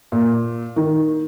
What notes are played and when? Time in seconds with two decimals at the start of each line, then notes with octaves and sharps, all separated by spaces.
0.12 A#2
0.76 D#3